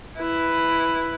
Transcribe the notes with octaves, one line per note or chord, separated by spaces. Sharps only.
E4 B4